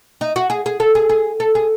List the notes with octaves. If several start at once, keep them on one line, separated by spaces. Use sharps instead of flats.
D#4
F#4
G#4
G#4
A4
G#4
G#4
A4
G#4